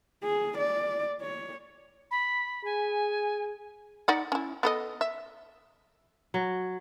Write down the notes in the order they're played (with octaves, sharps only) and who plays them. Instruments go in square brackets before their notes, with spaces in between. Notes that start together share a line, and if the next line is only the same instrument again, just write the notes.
[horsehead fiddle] G#4
D5
C#5
[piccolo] B5
[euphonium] G#4 [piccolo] G#5
[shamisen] D#4 D5 F#5
C#4 E4
B3 A4 D#5
E5
[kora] F#3